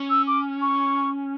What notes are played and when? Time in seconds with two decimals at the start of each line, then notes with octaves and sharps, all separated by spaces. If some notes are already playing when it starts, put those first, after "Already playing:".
Already playing: C#4
0.10 E6
0.27 D6
0.62 C#6